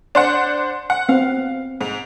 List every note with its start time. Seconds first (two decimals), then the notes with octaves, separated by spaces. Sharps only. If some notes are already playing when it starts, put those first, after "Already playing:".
0.15 D4 C5 F#5
0.90 F#5
1.09 B3 C4 F5
1.81 G#2